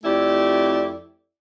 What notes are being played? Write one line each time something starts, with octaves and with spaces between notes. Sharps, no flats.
F2 A3 E4 G4 D5